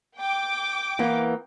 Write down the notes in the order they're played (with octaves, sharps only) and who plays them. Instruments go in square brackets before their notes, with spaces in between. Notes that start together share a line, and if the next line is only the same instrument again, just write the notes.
[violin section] G5 D6
[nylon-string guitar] E3 A#3 B3